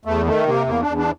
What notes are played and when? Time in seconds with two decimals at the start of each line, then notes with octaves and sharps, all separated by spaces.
0.05 E2 A3
0.26 D#3 A3
0.46 C3 A#3
0.67 E2 A#3
0.82 D4
0.87 E2
0.97 D4